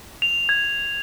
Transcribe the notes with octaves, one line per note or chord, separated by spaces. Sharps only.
F7
G#6